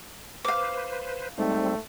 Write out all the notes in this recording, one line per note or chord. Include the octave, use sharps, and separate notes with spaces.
B4 C5 F5 D6
G#2 G3 A3 C4